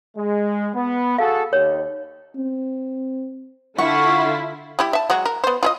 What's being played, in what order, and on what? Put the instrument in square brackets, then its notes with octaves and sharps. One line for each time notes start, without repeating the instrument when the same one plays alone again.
[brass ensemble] G#3
B3
[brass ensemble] F#4 G#4 A4 [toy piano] F5
[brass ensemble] D#2 [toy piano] C#5
[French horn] C4
[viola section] D3 F4 [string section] E4 [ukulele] F#5 [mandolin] C#6
[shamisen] G3 E4 G4
E5 A5
F#3 G#3 F#4
A#4
B3 C5
F4 G#4 D#5